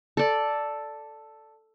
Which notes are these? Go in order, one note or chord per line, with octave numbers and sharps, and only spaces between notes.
A4 D5